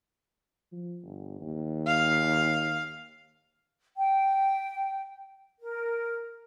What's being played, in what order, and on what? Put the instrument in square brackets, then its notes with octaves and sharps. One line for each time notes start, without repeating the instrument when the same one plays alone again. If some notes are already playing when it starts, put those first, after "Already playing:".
[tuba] F3
G1
D#2
[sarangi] F5
[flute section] G5
A#4